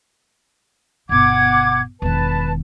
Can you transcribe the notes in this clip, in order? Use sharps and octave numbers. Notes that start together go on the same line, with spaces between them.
G1 B2 F#5 D6 G#6
E1 D#3 B4 A5